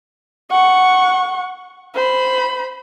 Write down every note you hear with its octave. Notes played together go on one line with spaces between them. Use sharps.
F#5 C#6
C5 B5